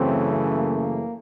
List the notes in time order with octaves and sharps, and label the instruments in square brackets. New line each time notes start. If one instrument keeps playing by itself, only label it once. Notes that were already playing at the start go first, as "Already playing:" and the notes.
Already playing: [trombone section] F#2 C#3 E3 A3 C4
A#3